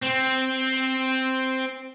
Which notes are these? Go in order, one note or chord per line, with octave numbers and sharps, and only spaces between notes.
C4